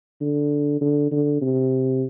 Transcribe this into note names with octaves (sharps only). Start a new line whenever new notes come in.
D3
D3
D3
C3